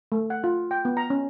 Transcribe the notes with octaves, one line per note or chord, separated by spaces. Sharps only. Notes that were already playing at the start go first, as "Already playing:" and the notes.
A3
F#5
F4
G5
B3
A#5
C#4